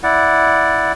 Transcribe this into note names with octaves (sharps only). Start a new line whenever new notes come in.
E4 D5 F#5